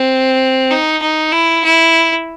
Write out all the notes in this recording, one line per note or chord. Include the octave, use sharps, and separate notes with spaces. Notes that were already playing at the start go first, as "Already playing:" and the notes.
Already playing: C4
D#4
D#4
E4
E4